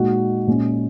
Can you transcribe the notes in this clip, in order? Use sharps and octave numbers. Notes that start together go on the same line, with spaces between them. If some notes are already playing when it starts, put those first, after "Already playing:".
Already playing: A#2 G#3 D#4 F#4
A#2 G#3 C#4